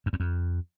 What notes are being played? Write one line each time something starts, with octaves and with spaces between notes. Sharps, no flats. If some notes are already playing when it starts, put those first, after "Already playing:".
F#2
E2
F2